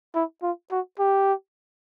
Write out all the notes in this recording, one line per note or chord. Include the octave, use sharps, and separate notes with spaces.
E4
F4
F#4
G4